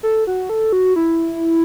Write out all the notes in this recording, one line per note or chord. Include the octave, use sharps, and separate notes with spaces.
A4
F#4
A4
F#4
E4